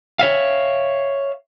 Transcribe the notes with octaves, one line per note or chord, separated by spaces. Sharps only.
C#5 E5 F5